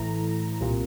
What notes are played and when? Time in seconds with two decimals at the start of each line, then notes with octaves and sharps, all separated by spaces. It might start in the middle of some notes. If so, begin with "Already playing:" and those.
Already playing: A1 A2 E3 A#5
0.61 C2 A#2